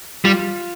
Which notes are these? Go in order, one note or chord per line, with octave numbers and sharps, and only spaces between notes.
G3 F4